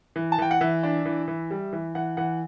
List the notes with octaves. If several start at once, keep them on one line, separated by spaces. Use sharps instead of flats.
E3
A5
E3 G5
F#5
E3 E5
D4
E3
E3
G3
E3
E3 F#5
E3 F#5